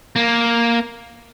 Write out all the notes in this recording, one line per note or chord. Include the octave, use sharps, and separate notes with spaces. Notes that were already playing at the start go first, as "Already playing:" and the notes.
A#3